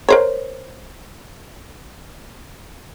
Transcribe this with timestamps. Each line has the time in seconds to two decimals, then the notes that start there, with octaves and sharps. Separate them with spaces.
0.09 A#4 C5 C#5